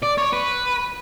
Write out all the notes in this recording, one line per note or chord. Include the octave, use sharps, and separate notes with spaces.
D5
C#5
B4